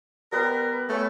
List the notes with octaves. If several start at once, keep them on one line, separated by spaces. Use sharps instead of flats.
G3 B3 A#4 B4
A3 B3 C#5 G#5